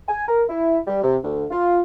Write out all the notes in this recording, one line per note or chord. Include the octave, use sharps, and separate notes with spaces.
G#5
A#4
E4
G3
C3
D2
F4